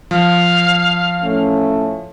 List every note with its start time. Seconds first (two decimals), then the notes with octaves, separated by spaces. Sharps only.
0.11 F3 F5
1.22 A2 A3 C#4